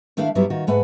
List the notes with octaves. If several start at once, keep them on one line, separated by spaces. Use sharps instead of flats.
D#3 A3 D4 E4 E5 F5
G2 F#3 G3 B3 E4
D#3 F4 F#4
G#2 A3 B4 F#5